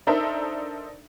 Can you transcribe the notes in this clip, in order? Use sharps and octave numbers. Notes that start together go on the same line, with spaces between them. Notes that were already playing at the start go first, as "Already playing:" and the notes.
D4 D#4 A4 A#4 C5 E5